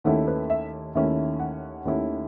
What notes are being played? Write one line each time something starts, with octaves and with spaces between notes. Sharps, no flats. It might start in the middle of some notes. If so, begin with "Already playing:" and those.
D#2 D#3 A3 C#4 E4 F#5
B4
E5
D#2 D#3 A3 C#4 E4 E5
F#5
D#2 D#3 A3 C#4 E4